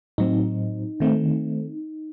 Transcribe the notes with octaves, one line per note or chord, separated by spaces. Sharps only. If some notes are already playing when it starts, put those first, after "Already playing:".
A2 F#3 C4 D#4
D#3 A3 C4